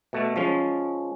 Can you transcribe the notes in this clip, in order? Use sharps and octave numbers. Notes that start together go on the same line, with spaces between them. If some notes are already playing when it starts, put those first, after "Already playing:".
B2 A3
F3 G#3 C#4